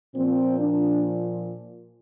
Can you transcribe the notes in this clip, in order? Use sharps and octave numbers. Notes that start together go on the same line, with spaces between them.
A#2 F3 C4
D4